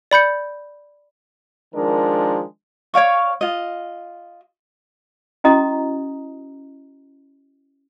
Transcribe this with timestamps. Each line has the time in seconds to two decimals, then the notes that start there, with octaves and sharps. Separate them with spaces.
0.11 D5 B5 G6 C#7
1.74 D#3 F3 G#3 D4 A#4
2.94 C#5 D5 F5 C#6
3.41 F4 D#5
5.44 C#4 E4 F#4 D#5 A#5 D#6